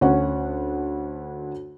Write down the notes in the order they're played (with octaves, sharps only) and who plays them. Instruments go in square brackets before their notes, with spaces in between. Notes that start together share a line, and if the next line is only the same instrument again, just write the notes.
[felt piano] D2 C#4 C#5 F#5